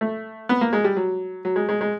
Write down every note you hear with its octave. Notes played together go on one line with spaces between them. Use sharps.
A3
B3
A#3
G#3
G3
F#3
F#3
G#3
G#3
G#3